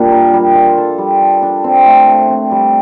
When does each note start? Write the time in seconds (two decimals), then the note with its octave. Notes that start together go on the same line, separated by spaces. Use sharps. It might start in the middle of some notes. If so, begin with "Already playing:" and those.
Already playing: A#2 G3 D4
0.12 A#4
0.33 G3
0.55 F4
0.78 A4
0.98 G3
1.21 A4
1.42 D4
1.64 C4
1.85 A3
2.08 C4
2.29 C4
2.51 G3